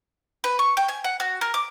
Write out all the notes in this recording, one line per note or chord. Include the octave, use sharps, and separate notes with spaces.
B4
C#6
G5
G#5
F#5
F#4
A#4
D6